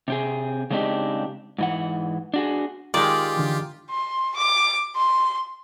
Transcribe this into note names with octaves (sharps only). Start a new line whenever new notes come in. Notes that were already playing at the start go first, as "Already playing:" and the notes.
C3 C4 G#4
C#3 G#3 C4 D4 D#4 G4
G#2 E3 F#5
D4 F#4 G#4
D#3 G#3 F4 G4 D5
D3 E3
C6
D6
C6